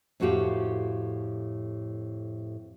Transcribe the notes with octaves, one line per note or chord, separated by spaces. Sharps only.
F2 A2 A3 F#4 G4 F5